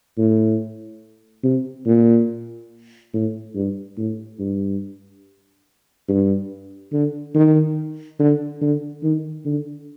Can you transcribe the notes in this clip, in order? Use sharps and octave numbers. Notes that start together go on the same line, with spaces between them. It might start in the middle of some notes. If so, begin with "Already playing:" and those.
A2
C3
A#2
A2
G2
A2
G2
G2
D3
D#3
D3
D3
D#3
D3